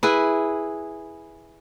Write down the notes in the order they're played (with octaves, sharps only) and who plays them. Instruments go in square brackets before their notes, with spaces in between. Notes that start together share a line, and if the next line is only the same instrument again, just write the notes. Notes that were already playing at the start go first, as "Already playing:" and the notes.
[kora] E4 G#4 B4